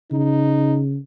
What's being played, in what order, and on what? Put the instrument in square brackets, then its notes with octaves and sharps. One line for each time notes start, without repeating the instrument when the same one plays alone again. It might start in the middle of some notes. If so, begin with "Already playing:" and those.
[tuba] C#3 [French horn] D#4